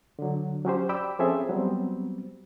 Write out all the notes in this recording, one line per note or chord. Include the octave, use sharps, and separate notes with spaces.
D3 F#3
F#3 C#4 G4 C5
D5 G5 B5 D6 E6
F3 C4 C#4 G#4 A4 E5
F#3 G3 B3 C4